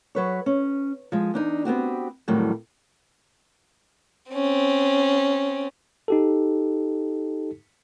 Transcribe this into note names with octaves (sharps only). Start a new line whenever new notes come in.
F#3 B4 C#5
C#4
F3 G#3
E2 D4 D#4
B3 C4 F#4 G4
F2 A2 D#3 F#3 G3
C4 C#4
D#4 G4 A4